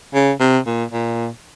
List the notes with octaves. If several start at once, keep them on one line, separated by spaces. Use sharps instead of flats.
C#3
C3
A#2
A#2